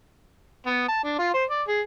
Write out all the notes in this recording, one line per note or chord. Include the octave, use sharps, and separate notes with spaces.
B3
A5
D4
F4
C5
D5
G#4